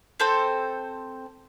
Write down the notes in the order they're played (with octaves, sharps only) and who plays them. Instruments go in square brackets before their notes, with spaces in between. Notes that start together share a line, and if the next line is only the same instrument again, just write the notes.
[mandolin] C4 A4 C5